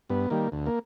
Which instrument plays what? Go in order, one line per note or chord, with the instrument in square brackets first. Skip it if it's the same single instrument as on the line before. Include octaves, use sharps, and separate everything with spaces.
[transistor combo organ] G2 B3
D#3 G3 A#3
D2
A#3